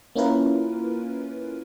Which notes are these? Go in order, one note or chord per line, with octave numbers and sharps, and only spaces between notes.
A#3 C#4 E4 F4 A#4 B4